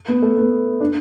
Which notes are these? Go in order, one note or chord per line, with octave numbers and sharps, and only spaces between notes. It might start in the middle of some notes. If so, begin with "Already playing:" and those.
B3
A3
B3
D4